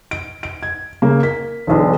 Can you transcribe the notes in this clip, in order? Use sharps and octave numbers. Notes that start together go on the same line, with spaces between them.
D7
D7
G#6
C#3 A#3
A#4 B6
E1 B1 D3